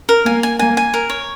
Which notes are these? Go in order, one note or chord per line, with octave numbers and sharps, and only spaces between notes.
A#4
A#3 G#5
G#5
A#3 G#5
G#5
A#4
C#5